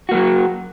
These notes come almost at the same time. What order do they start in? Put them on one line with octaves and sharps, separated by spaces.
F#4 A#3 F#3